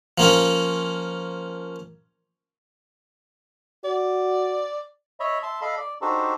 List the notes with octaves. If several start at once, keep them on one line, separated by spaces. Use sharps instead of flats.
F3 A#3 C#4
F#4 D5
C#5 D#5 E5 B5
E5 A5 C6
A4 D#5 F5 B5
D5
D4 D#4 F#4 G4 A4 C5